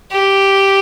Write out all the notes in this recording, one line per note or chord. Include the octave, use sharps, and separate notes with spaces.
G4